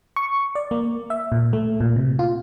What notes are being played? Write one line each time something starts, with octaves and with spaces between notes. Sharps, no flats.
C#6
D5
A#3
E5
A#2
A3
A#2
C3
F4